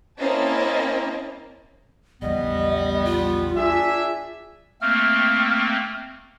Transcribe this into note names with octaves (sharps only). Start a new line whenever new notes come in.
A#3 C4 C#4 E4 D#5 A5
A#1 E2 G3 B3 D#5
F4
D4 G#4 E5
A3 A#3 C4 F6